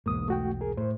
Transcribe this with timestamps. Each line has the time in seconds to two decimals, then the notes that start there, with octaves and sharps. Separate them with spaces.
0.06 B1 E2 G#2 A#3 D#6
0.28 A3 F#4 G5
0.61 G#4 A#4
0.77 A2 C5